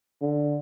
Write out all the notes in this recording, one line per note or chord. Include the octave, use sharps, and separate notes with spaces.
D3